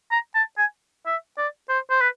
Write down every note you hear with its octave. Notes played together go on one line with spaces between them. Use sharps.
A#5
A5
G#5
E5
D5
C5
C5
B4